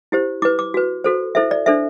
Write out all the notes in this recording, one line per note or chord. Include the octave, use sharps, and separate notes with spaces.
E4 G4 C5
E4 B4 D6
D6
F#4 B4
F#4 A4 C5
E4 A4 C5 E5
D5
D4 A4 C5 E5